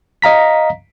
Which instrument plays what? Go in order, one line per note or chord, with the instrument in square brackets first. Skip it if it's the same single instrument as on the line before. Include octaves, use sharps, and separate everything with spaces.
[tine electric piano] D#5 F5 A#5 B6